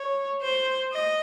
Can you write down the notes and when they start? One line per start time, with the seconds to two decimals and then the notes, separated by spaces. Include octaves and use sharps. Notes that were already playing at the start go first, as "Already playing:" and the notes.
Already playing: C#5
0.42 C5
0.92 D#5